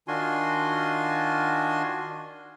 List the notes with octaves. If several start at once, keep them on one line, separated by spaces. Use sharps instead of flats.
D#3 D4 F4 F#4 G#5 C6